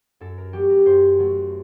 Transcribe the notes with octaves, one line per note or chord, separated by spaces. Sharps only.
F#2 A4
A#4
F#3 A3 G4
A#4
F#2 C5
F#3 A3